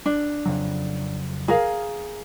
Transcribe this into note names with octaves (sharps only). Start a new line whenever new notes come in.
D4
F2 C#3 F#3
G#4 A#4 F5